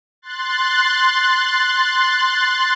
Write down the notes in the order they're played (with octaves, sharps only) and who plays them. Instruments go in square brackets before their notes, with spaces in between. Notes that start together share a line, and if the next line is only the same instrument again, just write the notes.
[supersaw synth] C6 F#6 A6